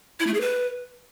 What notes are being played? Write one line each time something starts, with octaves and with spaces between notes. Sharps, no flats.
E4
A3
G#4
B4